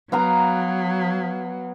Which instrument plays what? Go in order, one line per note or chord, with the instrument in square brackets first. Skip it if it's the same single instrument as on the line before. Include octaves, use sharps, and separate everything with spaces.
[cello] F#3 [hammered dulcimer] B3 F5 A#5